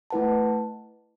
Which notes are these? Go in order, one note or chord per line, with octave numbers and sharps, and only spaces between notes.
A3 E4 B4 F#5 A5